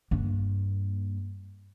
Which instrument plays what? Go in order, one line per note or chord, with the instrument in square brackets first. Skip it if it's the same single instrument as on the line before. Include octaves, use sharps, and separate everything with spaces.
[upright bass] G2 A#3